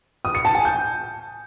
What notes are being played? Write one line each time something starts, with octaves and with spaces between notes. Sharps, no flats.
D#6
C#7
A5
G#5
G6